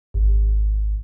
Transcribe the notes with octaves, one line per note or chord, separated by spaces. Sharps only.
G#1